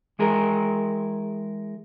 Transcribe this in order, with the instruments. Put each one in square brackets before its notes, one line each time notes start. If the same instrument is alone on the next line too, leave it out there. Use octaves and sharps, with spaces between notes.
[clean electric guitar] E3 G#3 G#4 A#4